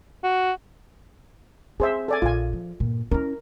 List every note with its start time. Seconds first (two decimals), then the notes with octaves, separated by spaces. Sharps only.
0.23 F#4
1.80 C4 G#4 C5 E5
2.08 A4 D5 G#5
2.22 A#1 F4 G#5
2.53 F3
2.80 G2 A#2
3.12 C#4 E4 A#4